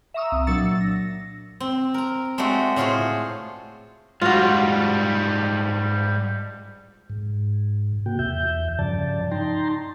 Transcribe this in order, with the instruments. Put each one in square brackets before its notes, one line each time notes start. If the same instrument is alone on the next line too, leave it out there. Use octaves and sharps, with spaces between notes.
[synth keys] E5 F5 A#5 C#6 D#6 E6
C2
A#2 F#3 D4 E6 A6 C#7
A#6
[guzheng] C4
A#4 A#5
G#3 A3 C4 D4 F#4 G4
A2 A3 F4 F#4 G#4 C5
[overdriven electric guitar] G#2 G3 [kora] F4 F#4
[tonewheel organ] G#2
C3 A#3 F#4 G5
E2 E5 G6
G2 C#3 F3 D5 A5
D#4 G5 A5 A#5 C6